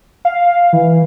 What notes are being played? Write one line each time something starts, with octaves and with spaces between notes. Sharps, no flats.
F5
E3